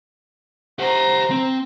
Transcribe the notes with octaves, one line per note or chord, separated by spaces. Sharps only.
G4 C5 F#5 A#5
C4